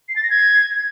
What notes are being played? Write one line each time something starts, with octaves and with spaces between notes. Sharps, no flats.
C7
A6
A#6
G#6